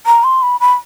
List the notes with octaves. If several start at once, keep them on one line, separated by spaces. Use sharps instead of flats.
A#5
C6
B5
B5